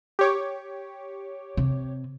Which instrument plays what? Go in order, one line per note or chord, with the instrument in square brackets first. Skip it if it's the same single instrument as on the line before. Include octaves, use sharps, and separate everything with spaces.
[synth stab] G4 C#5 D6
[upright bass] C3